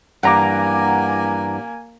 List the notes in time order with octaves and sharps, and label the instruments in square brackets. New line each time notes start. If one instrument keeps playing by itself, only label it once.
[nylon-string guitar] G2 E3 [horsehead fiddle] A#3 G#5 [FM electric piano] F#5 A#5 D6